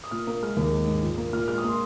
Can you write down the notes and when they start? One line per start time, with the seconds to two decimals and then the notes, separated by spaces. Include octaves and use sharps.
0.04 D#6
0.11 A#2 F6
0.27 A#3
0.43 G#3 F6
0.57 D#2
0.72 G#3
0.88 G#2
1.03 A#2
1.17 A#3
1.33 A#2 F6
1.48 G#3 F6
1.58 D#6
1.64 A#3 C6